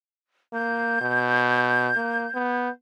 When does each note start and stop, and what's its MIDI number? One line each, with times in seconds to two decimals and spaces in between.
0.53 1.00 58
0.53 2.69 91
1.01 1.91 47
1.97 2.27 58
2.34 2.70 59